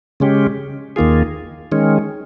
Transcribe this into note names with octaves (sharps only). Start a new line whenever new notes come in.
C#3 G#3 C#4 G4
D#2 D#3 A#3 F4 G#4
D#3 G#3 C#4